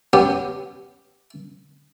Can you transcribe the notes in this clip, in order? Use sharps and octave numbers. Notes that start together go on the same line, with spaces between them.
B3 C#4 G4